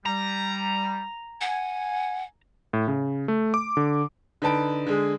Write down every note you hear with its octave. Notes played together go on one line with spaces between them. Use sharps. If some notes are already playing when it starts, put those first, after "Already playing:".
G3 A#5
F#5 G#5
A2
C#3
A3
D6
D3
D3 D#4 B4 A5 D7
D3 G#3 G#4